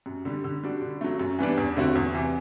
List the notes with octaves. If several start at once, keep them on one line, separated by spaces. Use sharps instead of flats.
F#2
D3 G3
D3
G3 D4 F#4
D3
F#3 A3
F#2
E3 G3 B3 D4
E2
D3 A3 C4 F#4
E2
C3 E3